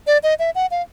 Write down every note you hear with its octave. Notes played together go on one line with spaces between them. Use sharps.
D5
D#5
E5
F#5
F5